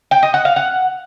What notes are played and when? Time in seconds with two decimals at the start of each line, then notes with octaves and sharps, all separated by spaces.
0.11 G5
0.23 D#5
0.34 F#5
0.45 F5
0.56 F#5